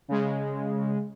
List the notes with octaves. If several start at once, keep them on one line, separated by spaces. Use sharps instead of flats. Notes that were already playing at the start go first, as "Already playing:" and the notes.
C#3 G#3